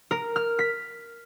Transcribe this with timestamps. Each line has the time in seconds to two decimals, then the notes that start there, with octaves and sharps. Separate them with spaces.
0.11 A#4
0.36 F6
0.59 B6